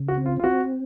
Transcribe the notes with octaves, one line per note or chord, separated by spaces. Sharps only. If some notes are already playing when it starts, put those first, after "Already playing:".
Already playing: C#3
F#4
C4
F4
F4
C4 F#4